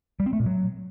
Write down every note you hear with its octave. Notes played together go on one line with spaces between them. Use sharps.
G3
C4
A3
A#2
F#3